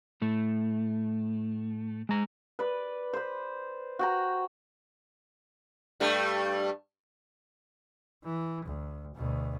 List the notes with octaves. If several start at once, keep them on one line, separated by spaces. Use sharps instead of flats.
A2 A3
G#3 A#5
B4 D5
B4 C5
F#4 G5 A#5
G2 G3 A3
E3
D2
D2 B2